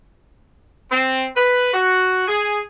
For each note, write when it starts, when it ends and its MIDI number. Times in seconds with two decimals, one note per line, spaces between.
0.91 1.25 60
1.36 1.73 71
1.74 2.27 66
2.28 2.61 68